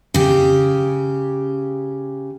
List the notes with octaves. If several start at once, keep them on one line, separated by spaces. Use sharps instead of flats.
C#3 G4